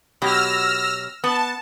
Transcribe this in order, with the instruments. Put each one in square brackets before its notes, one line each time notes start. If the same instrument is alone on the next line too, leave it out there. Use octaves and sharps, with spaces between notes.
[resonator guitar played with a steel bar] B2 F#3 G4 [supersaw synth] E6 F6 A#6
[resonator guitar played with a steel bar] B3 [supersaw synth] A5